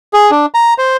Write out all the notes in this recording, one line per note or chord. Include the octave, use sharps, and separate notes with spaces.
G#4
D4
A#5
C5